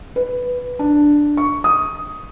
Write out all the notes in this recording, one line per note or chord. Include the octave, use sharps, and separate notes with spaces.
B4
D4
C#6
D#6